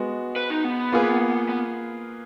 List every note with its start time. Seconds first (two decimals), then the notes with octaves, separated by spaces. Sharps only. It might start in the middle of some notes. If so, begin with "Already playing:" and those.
Already playing: G#3 B3 F#4
0.36 B4
0.50 D#4
0.64 B3
0.92 A#3 F4 G#4 B4
1.49 B3